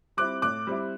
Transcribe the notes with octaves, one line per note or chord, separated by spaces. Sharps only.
G3 C4 E4 D6 F#6
A2 D6 F#6
G3 C4 E4